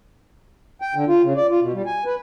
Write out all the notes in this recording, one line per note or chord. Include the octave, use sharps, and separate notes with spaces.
G5
D3
F4
C#3
D5
F4
B2
G3
G#5
B4